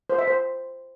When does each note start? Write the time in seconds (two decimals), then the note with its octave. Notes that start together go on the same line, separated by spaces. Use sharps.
0.10 C5
0.19 E5
0.28 C5